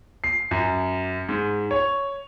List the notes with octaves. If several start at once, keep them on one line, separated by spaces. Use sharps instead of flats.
C7
F#2
G#2
C#5